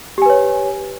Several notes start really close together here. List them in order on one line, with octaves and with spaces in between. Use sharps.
G4 G#5 B4 C#5